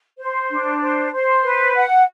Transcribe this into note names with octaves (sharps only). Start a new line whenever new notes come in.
C5
D4
C5
C5
B4
F#5